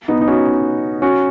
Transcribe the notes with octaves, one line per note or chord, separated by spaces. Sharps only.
B3 D#4
D#4
C#4 F#4
C#4 F#4